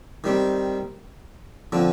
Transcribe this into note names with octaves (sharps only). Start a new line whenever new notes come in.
D#3 G3 C4
D3 F3 C4